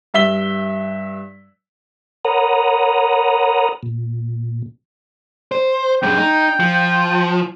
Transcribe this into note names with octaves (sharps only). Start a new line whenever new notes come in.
G2 E5 B6 G7
A#4 C#5 F#5 A#5 B5 D#6
A#2
C5
F#2 G#3 G5
D#4
F3